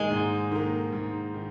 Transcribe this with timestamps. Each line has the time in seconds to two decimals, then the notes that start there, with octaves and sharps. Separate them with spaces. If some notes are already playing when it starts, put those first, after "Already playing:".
Already playing: G#2 D#3 G#3 A#3
0.11 G#2
0.51 D#3 A#3
0.92 G#2
1.34 D#3